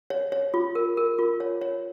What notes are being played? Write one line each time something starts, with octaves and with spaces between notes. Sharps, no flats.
C#5
C#5
F4
A#4
A#4
F4
C#5
C#5